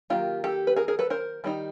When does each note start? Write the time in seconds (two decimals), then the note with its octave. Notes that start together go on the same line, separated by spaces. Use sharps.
0.10 D#3 F#3 A#3 F4 G4
0.44 G4 A4
0.67 B4
0.76 G#4 A#4
0.88 G#4 A#4
0.99 A4 B4
1.10 A#4 C5
1.44 D#3 G3 C4 D#4